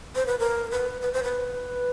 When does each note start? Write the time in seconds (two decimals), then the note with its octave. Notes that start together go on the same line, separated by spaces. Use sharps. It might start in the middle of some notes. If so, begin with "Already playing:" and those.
0.16 C5
0.27 B4
0.39 A#4
0.71 B4
1.02 B4
1.13 C5
1.23 B4